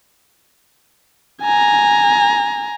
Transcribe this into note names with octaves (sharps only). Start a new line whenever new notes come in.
G#5 A#5